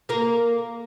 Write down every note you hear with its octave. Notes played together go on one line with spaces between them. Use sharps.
A#3 A#4